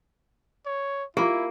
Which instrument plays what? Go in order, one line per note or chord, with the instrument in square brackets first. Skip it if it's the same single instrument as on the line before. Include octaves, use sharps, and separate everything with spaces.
[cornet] C#5
[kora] A#3 [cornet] E4 [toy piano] F4 G4